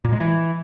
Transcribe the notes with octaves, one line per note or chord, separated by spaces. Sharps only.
A#2
G#3
E3